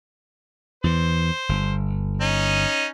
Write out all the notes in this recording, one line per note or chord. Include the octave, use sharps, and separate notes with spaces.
E2 E3 C5
G1
C#4 D#4